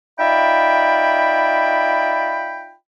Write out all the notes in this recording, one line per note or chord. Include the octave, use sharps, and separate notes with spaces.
D#4 F4 D5 E5 G5 B5